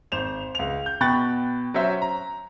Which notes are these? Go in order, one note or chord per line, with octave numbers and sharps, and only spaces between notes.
G#1 C5 E7 F7
C#2 F7
G6
B2 G5 B5 C#6 F#6 A6
F#3 C#4 C5 E5
A#5